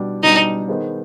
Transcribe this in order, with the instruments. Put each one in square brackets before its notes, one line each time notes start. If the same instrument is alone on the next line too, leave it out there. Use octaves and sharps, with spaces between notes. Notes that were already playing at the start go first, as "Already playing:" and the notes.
Already playing: [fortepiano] B2 G3 D4
[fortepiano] B2 G3 D4 [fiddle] D#4
[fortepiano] D#3 B3 D#4 G#4 C5